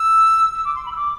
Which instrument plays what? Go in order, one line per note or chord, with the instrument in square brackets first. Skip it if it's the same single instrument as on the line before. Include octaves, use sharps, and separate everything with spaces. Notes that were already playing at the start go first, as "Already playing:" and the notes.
Already playing: [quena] E6
E6
D6
C6
B5
E6
D6